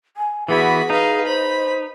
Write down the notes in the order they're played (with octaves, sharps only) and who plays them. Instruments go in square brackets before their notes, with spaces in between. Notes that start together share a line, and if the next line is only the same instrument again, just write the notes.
[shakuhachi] G#5
[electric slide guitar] E3 B3 E4 [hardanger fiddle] F#4 B5 [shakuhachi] G#4
[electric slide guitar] D#4 [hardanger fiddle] B4 F5
[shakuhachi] C5 [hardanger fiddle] B5